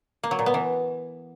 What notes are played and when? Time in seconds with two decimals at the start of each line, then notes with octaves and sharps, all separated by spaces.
0.23 A#3
0.31 F#3
0.39 A#2
0.46 B3
0.54 E3